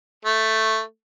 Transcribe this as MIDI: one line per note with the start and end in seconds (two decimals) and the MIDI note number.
0.25 0.80 57